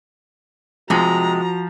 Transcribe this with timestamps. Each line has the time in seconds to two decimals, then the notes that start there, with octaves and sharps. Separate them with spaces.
0.90 C3 F3 G#3 F#4 A#5